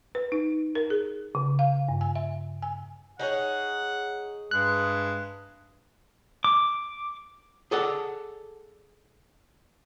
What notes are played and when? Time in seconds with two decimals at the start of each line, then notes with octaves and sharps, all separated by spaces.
0.15 B4
0.32 D#4
0.75 A#4
0.90 G#4
1.35 C#3
1.59 F5
1.89 G2
2.01 G#5
2.16 E5
2.62 G#5
3.19 D#4 G#4 C#5 F#5
4.51 G2 G#3 F#6
6.44 D6
7.71 G#4 A4 D5 F#5 A5